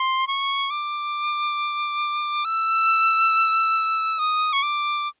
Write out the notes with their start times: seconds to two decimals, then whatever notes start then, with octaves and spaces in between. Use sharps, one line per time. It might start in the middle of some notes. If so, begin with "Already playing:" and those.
Already playing: C6
0.28 C#6
0.70 D6
2.45 E6
4.19 D#6
4.53 C#6
4.63 D6